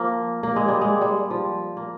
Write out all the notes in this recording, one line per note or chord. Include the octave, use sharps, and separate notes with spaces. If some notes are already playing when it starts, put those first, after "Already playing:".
Already playing: F3 A#3
A#3
G#3
G3
G#3
G3
F3
A#3